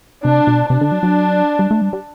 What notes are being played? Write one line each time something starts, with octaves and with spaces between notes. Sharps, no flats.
C3 D4
B2
C3 D4
D3
F#3
F#3
G3
A3
G3
G3